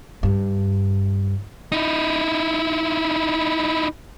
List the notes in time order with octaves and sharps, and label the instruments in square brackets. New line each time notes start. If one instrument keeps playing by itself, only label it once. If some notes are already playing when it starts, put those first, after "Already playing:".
[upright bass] G2
[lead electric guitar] D#4 E4